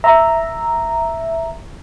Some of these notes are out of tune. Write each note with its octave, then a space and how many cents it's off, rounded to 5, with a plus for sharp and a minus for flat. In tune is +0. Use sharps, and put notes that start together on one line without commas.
E5 +0 A#5 -5